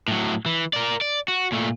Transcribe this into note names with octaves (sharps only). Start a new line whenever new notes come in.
A2 F#3
E3
A#4 D5
D5
F#4
A#2 A3